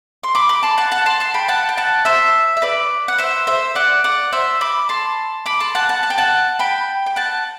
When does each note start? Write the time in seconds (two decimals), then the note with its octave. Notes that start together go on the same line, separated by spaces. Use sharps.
0.23 C6
0.35 B5 D6
0.49 B5 D6
0.63 A5 C6
0.78 F#5 A5
0.91 F#5 A5
1.06 A5 C6
1.20 A5 C6
1.34 G5 B5
1.48 F#5 A5
1.69 G5
1.77 F#5 A5
2.05 C5 E5
2.57 E5
2.62 B4 D5
3.08 F#5
3.18 C5 E5
3.47 C5 E5
3.75 D5 F#5
4.04 D5 F#5
4.32 C5 E5
4.61 B5 D6
4.89 A5 C6
5.46 B5 D6
5.60 A5 C6
5.75 F#5 A5
5.89 F#5 A5
6.03 A5
6.10 G5
6.18 F#5 A5
6.59 G5 B5
7.06 G5
7.16 F#5 A5